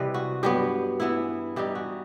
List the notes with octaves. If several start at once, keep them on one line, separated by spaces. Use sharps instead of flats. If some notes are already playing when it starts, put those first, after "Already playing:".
Already playing: C3 E3 G3 B4 D#5
F#4
G2 F#3 B3 G4
E3 B3 E4
E3 G3 D#4 G4
F#4